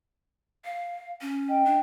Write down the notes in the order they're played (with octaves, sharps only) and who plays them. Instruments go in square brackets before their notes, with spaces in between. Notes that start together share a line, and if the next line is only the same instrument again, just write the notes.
[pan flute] F5
C#4
[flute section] D#5 G5
[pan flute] D4